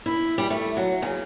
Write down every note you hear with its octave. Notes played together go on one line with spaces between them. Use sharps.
E4
G3
A3
F#3
C#3